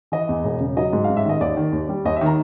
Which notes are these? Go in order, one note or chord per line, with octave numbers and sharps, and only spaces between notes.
E3 D#5
E2
E1
C#3
F#3 D#5
G#2
A1 F5
E5
D#3 D#5
D#2 D5
D#3
D#2
G3
D#2 D#5
E5
D#3
A#5